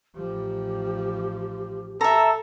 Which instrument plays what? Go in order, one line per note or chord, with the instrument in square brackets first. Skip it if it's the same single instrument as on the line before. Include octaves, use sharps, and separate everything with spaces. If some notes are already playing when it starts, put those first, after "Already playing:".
[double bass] A1 F3 [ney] G4
[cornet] A4 [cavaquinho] E5 A#5